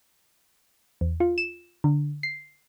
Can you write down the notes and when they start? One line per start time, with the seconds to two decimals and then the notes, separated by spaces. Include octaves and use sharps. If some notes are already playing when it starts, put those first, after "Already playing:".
1.01 E2
1.20 F4
1.38 E7
1.84 D3
2.23 C7